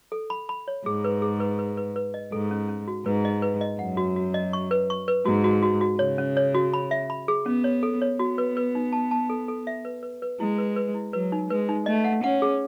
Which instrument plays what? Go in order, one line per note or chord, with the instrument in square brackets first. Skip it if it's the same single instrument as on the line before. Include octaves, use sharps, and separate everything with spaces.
[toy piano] A4
B5
B5
C#5
[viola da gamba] G#2 [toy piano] G#4
[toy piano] B4
G#4
B4
B4
B4
B4
D#5
[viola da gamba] G#2 [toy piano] A4
[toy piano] C#4
C#4
F#4
[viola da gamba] G#2 [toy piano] B4
[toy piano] D#5
B4
D#5
[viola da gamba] F#2 [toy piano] F#5
[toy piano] F#4
F#4
D#5
C#6
B4
C#6
B4
[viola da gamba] G#2 [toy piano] F#4
[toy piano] F#4
F#4
F#4
[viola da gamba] C#3 [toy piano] C#5
[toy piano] C#4
C#5
F#4
B5
E5
B5
G#4
[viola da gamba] B3 [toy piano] C#4
[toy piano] C#5
A4
C#5
[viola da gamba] B3 [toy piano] F#4
[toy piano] B4
B4
D#4
A5
A5
A4
A4
E5
B4
B4
B4
[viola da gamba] G#3 [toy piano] E4
[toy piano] B4
B4
E4
[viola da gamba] F#3 [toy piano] B4
[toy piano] D#4
[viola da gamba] G#3 [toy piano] B4
[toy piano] D#4
[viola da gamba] A3 [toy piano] D#5
[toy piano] F#5
[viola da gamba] C#4 [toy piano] F#5
[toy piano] G#4